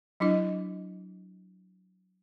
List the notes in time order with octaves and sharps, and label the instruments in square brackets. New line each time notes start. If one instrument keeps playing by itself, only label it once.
[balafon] F#3 D4 E4 D#5